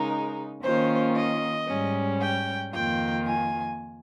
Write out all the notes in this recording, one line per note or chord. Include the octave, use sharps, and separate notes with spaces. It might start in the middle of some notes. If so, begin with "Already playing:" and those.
Already playing: C#3 G#3 D#4 A#4
D#3 A#3 C#4 F4 C5
D#5
G#2 G3 C#4
G5
F2 D#3 A#3 F4 G5
G#5